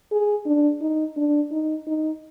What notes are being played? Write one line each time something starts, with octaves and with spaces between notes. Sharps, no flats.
G#4
D4
D#4
D4
D#4
D#4